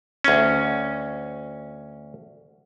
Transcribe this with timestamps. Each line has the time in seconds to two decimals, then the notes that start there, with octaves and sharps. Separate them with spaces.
0.24 D2 C#4